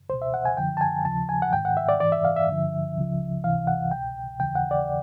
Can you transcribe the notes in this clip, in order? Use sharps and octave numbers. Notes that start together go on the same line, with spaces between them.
C#2 B2 C5
E5
F#5
G#5
F#2 D3 F3 G5
A5
G#5
D#2 C#3 F3 A5
G#5
F#5
G#2 D#3 G5
F#5
E5
D5
G#2 E3 D5
E5
F5
E5
G2 D3 F3
C#2 C#3 F3
C#2 C3 E3 F5
F#5
C2 B2 G5
D#2 C#3 E3 G5
F#5
D5